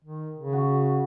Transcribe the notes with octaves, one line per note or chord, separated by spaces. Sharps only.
D#3
C#3
F#4